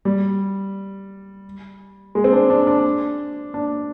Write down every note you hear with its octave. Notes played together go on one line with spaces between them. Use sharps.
G3
G#3
C4
D4
D4
D4
D4